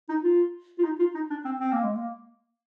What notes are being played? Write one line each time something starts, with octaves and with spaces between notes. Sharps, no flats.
D#4
F4
F4
D#4
F4
D#4
D4
C4
C4
A#3
G#3
A#3